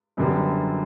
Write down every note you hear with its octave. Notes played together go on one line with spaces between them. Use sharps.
F#1 F#2 D3 G3 B3